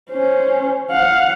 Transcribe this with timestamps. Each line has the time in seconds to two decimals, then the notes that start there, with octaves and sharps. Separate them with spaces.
0.11 C#4 C5
0.91 F5 F#5